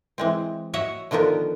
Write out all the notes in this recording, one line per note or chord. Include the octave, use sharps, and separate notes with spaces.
E3 G#3 C4
F#4 C#5 D#5 E5 F#5
D3 D#3 F3 B3 A#4